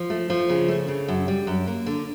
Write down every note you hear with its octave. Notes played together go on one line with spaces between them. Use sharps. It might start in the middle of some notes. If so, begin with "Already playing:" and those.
Already playing: F3
A3
F3
C#3
A3
C#3
F#2
G3
F#2
A#3
D3